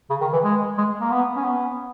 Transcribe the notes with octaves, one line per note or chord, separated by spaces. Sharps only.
C#3
D#3
E3
G#3
G#3
A#3
B3
C#4
B3